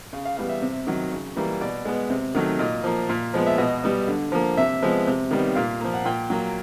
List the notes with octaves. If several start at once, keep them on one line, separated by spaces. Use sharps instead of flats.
C#3 F5
F5
E3 G3 B3 F5
E5
C3
D#3 F#3
C#3
E3 G3 A#3
B2 D5
G#3 B3
C3
D#3 F#3 A3
A#2 D#5
F3 A#3
A#2
F3 G#3 B3
E5
B2 D#5
G3 B3
D3
F3 A#3
C3 E5
F3 G#3 B3
C3
D#3 G3 B3
A#2 F5
F3 A#3
F#5
A#2 G5
F#3 A#3